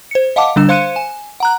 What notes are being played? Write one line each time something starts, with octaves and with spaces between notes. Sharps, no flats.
C5 C#7
D#5 F5 F#5 A5 D6
D3 G3 D4 E6 E7
C5 F5 C6 F#6 C#7 D#7
G#5
F#5 A#5 F#6